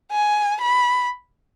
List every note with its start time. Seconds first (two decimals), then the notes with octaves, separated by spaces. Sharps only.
0.12 G#5
0.61 B5